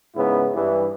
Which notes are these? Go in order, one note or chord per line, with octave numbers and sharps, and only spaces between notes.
G#2 C#3 B3 E4
G2 E3